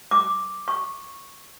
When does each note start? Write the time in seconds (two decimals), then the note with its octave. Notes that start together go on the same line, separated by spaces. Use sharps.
0.11 D6
0.68 C#6